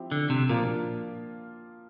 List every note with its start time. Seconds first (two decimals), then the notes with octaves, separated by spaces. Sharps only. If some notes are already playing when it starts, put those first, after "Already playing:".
Already playing: F3 C4 E4 G4
0.12 D3
0.30 C3
0.49 A#2 F3 A#3 D4 F4